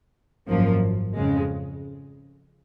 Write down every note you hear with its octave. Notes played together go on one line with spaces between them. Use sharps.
G#1 F#2 F3 A#3
F2 C#3 G#3